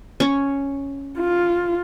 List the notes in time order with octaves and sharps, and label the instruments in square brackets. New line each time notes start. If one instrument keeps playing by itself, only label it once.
[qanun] C#4 C#5
[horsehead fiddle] F4